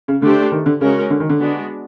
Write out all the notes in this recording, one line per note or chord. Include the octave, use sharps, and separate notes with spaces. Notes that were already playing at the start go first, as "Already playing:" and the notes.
C#3
D3 A3 D4 G4 C5
D#3
D3
C#3 G#3 C#4 F#4 A#4
D3
D#3
D3
G#3 B3 D4 F#4